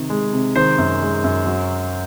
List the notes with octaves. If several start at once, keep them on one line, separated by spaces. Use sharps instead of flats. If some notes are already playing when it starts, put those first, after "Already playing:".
Already playing: C3 D#3
G#3
C3
D#3 C5
F#2
G#3
F#2
F#3